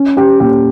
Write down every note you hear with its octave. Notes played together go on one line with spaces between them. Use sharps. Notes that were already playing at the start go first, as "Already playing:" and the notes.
Already playing: C#4
C#4 G4
A#2 G4